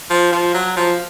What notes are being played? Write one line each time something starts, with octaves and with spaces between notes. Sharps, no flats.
F3
F3
F#3
F3